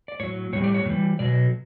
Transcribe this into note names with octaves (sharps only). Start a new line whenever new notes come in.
D5
A2 F#3 C#5
A2 E3 G3 C#5
D5
C#5
A2 E3 G3
B2 F#3 D5